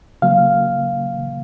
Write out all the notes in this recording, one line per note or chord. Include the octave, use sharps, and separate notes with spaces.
C#3 F#3 A#3 F5